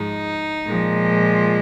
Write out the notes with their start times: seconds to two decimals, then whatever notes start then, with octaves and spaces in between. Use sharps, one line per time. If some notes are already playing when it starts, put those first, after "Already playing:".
Already playing: G#2 F3 G#3 D#4
0.65 A#2 F3 G#3